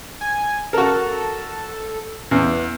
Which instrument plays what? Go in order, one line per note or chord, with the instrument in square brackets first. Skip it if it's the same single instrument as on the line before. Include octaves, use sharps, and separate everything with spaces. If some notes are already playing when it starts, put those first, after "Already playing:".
[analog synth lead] G#5
[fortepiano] F#4 A#4 [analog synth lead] A4
[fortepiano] E2 [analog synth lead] B3